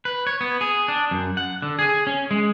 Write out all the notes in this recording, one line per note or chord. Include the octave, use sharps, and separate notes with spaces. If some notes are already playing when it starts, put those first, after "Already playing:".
B4
C#5
B3
G#4
D4
F#2
F#5
D3
G#4
C#4
G#3